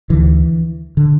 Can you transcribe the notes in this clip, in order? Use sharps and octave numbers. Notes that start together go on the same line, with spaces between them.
D2 D3 E3
D3